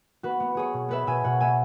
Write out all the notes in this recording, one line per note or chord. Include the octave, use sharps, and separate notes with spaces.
B3 F#4 B4
B3
B3 G#4 C#5
B2
B3 B4 E5
B2 E5 G#5
B2 C#5 F#5
B3 E5 G#5